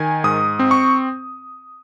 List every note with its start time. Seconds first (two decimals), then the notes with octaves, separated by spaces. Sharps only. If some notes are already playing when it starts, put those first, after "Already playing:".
Already playing: D#3 G#5
0.24 G#2 D#6
0.59 C4
0.71 C#6